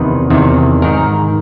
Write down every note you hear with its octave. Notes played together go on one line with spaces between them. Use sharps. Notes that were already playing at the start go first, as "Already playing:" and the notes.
Already playing: E2 C3 D#3 B4
E2 C3 D#3
G#2 D#3 A#4